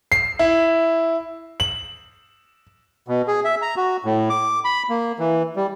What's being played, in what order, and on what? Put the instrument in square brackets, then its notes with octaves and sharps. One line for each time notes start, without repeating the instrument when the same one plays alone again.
[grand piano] C7
E4
F#7
[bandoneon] B2
G#4
E5
A#5
F#4
A2
D6
B5
A#3
E3
G3